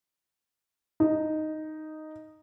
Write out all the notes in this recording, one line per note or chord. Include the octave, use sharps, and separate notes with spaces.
D#4